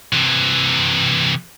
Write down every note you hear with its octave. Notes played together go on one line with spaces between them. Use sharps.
C3 E3